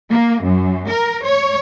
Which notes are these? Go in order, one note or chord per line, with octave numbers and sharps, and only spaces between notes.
A#3
F#2
A#4
C#5